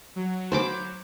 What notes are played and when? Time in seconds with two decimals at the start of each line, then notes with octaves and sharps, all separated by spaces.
0.16 F#3
0.52 C5 B5 D6